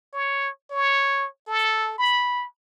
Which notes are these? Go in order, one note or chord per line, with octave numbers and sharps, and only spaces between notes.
C#5
C#5
A4
B5